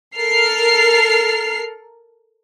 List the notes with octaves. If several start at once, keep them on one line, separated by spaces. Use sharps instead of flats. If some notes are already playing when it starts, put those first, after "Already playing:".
A4 A#4 F6 C7